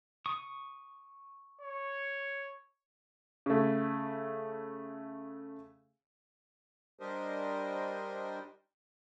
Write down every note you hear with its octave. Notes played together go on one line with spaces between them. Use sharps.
C#6 D#6
C#5
C#3 A3
G3 D4 G4 A#4 C5 D#5